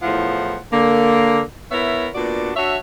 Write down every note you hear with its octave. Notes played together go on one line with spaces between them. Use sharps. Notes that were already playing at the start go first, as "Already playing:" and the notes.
E2 A2 F3 F4 F#5
D3 A#3
B3 E4 A#4 C#5 E5
A#2 B3 D4 F#4 D5
D4 F#4 C#5 E5